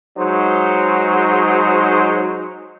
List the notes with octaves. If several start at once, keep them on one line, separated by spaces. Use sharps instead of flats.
F#3 G#3 D#4 C5